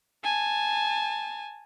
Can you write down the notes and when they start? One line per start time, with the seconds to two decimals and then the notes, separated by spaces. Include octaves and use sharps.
0.24 G#5 A5